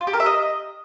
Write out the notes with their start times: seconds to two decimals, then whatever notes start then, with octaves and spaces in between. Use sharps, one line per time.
0.01 F4
0.07 G4
0.13 A#4
0.20 E5
0.26 D#5